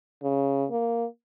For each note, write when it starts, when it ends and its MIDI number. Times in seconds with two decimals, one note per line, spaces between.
0.23 0.66 49
0.71 1.05 58